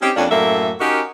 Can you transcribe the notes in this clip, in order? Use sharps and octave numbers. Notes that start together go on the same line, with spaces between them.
C4 C#4 D#4 G4
F2 A#3 C#4 D4
F#2 A2 A3 A#3 A4 E5
C#4 D#4 F#4 G4 A#4